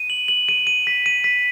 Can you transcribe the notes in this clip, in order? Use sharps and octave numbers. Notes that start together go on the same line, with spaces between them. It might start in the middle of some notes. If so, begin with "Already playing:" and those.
Already playing: D#7
F#7
F#7
D#7
D#7
B6
D#7
B6